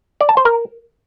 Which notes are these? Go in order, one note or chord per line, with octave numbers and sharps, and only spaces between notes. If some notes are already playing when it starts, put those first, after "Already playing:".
D5
A5
C5
A#4